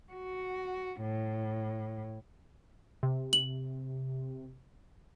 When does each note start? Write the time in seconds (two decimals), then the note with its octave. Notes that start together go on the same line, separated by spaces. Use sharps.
0.13 F#4
1.02 A2
3.03 C3
3.33 F#7